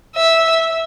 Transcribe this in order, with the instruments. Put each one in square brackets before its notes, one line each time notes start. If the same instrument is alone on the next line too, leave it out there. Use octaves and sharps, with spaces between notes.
[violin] E5